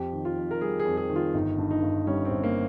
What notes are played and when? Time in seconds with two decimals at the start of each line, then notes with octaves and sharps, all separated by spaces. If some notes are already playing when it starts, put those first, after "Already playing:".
Already playing: F2 G4
0.13 D#3
0.25 F4
0.37 F2
0.51 A#4
0.61 G3 G#4
0.80 G#4
0.85 F2
0.97 G#4
1.10 D#3
1.16 F4
1.34 G1 D#4
1.58 G2
1.71 D#4
1.82 G1
2.07 G3 C#4
2.25 C4
2.31 G1
2.44 A#3